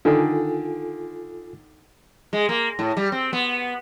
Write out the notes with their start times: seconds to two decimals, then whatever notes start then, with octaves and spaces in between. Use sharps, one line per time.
0.05 D3 D#3 F4 A4 G#5
2.33 G#3
2.49 A#3
2.79 A2
2.97 G3
3.12 C4
3.33 B3